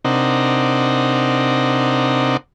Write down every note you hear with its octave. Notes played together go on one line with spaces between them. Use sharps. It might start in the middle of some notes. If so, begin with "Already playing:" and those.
C3 C4 D4 D#4 A#4 F#5